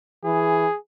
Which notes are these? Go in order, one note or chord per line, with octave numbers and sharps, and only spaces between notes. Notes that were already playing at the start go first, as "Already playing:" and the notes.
E3 G#4